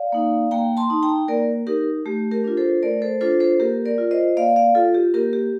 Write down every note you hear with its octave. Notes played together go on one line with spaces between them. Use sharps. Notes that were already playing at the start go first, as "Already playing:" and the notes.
Already playing: D5 F5
A#3 D#4
A#3 G5 A#5
A5 C6
D#4
G5 A#5
A#3 A#4 D5
D#4 G4 A#4
A3 G4
G4 A#4
D4 F4
A4 C5
A3 A#4 D5
A4 C5
D4 F4 A4 C5
A4 C5
A#3 G4 A#4
A#4 D5
F4
C5 D#5
A#3 D5 F5
D5 F5
F4 A4
G4
A#3 G4 A#4
G4